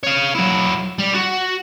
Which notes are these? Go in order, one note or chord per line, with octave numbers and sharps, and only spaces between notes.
C#5 F5
F#3 E4
G3
F#4